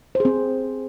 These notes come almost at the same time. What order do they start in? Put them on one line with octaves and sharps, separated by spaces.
C5 G#4 C4